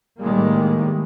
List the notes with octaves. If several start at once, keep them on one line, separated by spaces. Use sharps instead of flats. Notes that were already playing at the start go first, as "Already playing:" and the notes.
A2 D#3 G3 G#3 A#3